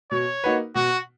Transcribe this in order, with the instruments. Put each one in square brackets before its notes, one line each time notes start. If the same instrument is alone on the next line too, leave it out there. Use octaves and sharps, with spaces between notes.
[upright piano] B2 [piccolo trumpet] C#5
[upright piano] A#3 D#4 F#4 B4
[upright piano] B2 [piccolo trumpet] F#4